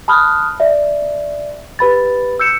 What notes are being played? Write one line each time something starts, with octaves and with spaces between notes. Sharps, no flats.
A5 B5 D#6 F6 F#6
D5 E5
G4 B4 B5 A6
E6 G6 C#7 E7